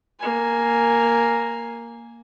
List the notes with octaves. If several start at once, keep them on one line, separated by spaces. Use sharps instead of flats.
A#3 G#5